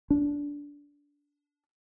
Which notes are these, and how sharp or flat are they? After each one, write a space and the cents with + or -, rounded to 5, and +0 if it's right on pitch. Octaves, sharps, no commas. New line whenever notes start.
D4 -20